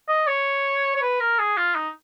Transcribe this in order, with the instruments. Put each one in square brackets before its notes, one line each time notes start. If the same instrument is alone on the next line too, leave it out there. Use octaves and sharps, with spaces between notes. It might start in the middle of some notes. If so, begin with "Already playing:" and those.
[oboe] D#5
C#5
C#5
B4
A#4
G#4
F4
D#4